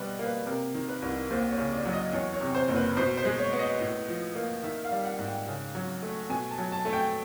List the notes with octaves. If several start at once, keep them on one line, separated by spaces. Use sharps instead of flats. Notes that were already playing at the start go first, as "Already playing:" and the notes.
Already playing: B2 G3 B4 D#5
A#3
B4
C3 A#4
D#3
B4
C2
D#2 C5
C#5
C#3
D5
F#3
D#5
E2 C#5
C#5
C3
C5
F#1
B4
B2 C5
C5
G#3
C#5
B3
D#5
A2
F3
A#3
D#3 E5
F5
G3
F#5
G#2
G5
C#3
F#3
A3
B2 G#5
A5
F#3
A5
A3
G5